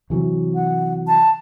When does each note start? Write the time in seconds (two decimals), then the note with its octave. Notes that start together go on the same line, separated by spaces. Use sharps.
0.10 C3 E3 F#3
0.55 F#5
1.07 A5